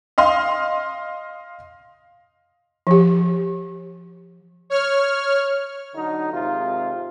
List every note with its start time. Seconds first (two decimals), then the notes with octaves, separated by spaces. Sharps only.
0.18 D#5 F5 C6 D#6
2.87 F3 G4
4.70 C#5 F6
5.94 D3 F#3 D#4
6.31 G#1 C3 G#3 F4